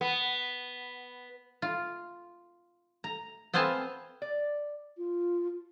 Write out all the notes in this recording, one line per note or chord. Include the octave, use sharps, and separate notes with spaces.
B3
F4
A#5
B3 C4 C5 F5 G#5 A5
D5
F4